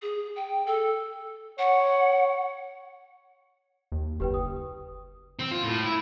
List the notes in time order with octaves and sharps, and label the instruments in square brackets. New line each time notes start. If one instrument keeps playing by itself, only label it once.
[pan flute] G#4
G5
A4
[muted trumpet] C#5 [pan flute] F#5
[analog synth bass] D#2
[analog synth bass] F#1 [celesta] G4 B4 G5
[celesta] D#6
[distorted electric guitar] C4
F4
A2
E4